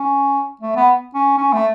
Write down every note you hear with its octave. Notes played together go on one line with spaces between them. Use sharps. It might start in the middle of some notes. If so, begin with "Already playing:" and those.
Already playing: C#4
A3
B3
C#4
C#4
A3